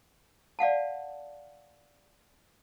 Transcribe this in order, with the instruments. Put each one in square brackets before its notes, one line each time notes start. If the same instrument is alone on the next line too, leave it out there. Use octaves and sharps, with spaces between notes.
[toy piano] D5 F5 F#5 A5